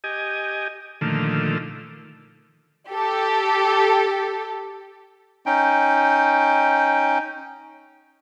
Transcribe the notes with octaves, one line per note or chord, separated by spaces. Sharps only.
G4 D#5 G#5
A#2 D3 D#3 F3 A3
G4 A4
C#4 D#4 G5